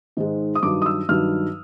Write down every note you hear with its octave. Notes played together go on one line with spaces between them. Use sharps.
G#2 D#3 G#3
D#6
G2 D#3 F#3 D6
D#6
E6
G2 D#3 F#3 F6